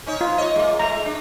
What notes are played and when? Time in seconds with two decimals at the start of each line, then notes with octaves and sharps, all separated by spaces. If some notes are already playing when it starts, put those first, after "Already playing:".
0.06 C#4 D#4 C#5
0.21 F4
0.38 C#5 D#5
0.56 G#3 A#3
0.79 G#3 A3 A#5
1.05 D4